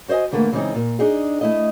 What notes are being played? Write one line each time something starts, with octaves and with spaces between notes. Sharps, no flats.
F#4 C5 C#5 D#5 G#5
G#2 D3 E3 A3 A#3
C#3 E3 G#3 C4 D#4
A#2
D4 D#4 G#4
A3 E4 D#5